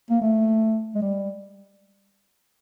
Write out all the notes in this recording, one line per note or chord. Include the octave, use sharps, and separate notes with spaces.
A#3
A3
G#3
G3